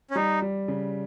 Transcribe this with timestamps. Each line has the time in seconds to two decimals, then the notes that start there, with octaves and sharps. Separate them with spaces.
0.11 C#4
0.15 G3 D#4
0.42 G3
0.68 C#3